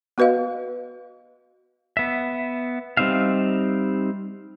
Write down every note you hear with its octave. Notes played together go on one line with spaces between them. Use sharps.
B3 F#4 B4 D#5 F5
B3 E5
G3 C4 D#4 E5 F5